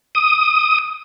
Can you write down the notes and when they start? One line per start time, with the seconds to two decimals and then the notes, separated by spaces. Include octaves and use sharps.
0.15 D#6